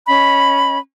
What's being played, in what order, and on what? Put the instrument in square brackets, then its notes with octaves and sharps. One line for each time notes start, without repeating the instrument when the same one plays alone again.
[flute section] C#4 D#5 B5